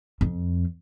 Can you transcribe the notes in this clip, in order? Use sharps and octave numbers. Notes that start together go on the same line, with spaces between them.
F2